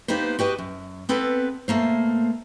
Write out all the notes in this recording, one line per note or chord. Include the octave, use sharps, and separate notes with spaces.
A#3 B3 D#4 G4 B4 C5
F#4 G4 B4 D#5
F#2
B3 C4 A4 B4
B2 A3 A#3 C5